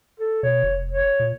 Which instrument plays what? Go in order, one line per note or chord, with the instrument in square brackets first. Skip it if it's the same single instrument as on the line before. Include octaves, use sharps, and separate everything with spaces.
[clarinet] A4
[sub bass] B2 [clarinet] C#5
[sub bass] F1
[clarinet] C#5
[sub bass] A#2